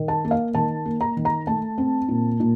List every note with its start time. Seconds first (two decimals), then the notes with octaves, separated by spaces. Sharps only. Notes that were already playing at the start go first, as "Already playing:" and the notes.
Already playing: D#3
0.08 A5
0.25 A#3
0.31 F5
0.55 D#3 A5
0.86 A#3
1.01 A#5
1.17 D#3
1.25 A#5
1.47 A3 A5
1.78 C4
2.08 A#2
2.40 A#2